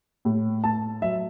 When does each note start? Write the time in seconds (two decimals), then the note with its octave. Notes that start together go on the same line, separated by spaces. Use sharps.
0.25 A2
0.63 A2 A5
1.01 F#3 E5